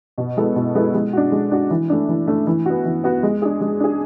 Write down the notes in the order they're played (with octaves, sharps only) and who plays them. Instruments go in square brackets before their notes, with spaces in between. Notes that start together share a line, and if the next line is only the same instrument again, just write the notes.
[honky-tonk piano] B2
G#3 B3 E4 A4
B2
G#3 B3 E4 A4
G#3
D4 F#4
G#3
D4 F#4
E3
A3 D4
E3
A3 D4
E3
B3 F#4
E3
B3 F#4
G#3
D4 G#4
G#3
D4 G#4